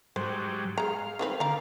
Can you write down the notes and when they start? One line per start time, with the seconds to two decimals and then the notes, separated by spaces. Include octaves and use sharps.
0.16 G#2 F#3 G3 C5
0.78 G#3 F5 A#5
1.19 D#3 C4 B4
1.40 D3 F5 A#5